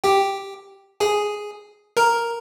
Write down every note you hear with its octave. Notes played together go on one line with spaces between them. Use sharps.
G4 G5
G#4 G#5
A#4 A#5